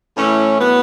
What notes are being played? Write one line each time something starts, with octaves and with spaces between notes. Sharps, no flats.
A2 E3 A3 C#4
A2 F#3 B3